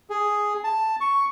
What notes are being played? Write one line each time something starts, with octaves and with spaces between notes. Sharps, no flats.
G#4
A5
C#6